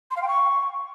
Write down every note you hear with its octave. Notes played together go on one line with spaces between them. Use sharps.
C6
F5
G5
C#6